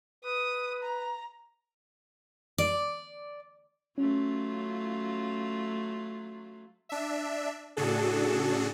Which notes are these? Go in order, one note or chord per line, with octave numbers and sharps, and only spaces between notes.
B4 D#6
A#5
D5
F#3 A3 C#4 F4
D4 E5
A2 C#3 D4 F#4 G#4 A4